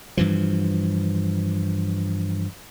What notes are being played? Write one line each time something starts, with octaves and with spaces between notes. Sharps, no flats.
G2 E3 F3